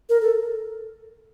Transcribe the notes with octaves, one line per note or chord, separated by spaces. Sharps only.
A#4
A4